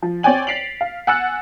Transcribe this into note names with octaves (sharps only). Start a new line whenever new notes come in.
F3
C4 C#5 D5 G5 G#5 F#7
A6 B6 C7 D7 F7 F#7
F5
F#5 G#5 E6 F#6 A6 C#7